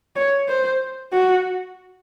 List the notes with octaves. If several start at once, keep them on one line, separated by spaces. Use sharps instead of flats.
C#5
C5
F#4